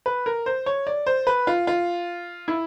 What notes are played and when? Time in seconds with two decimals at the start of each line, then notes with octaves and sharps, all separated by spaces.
0.06 B4
0.26 A#4
0.46 C5
0.66 C#5
0.87 D5
1.07 C5
1.27 B4
1.47 F4
1.67 F4
2.48 E4